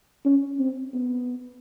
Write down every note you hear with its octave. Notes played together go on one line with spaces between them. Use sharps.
C#4
C4
B3